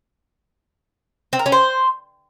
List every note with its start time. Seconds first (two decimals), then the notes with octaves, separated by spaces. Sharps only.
1.33 C4
1.39 A#4
1.46 C#4
1.52 C5